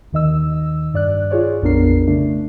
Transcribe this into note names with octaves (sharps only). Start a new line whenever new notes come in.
D#2 D#3 D#5 E6
G2 D5 F#6
F4 G#4 C#5 D5
A#1 F2 B3 D4 A#4 C7
C#3 A3 D4